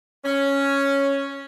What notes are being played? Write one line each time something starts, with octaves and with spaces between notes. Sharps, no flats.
C#4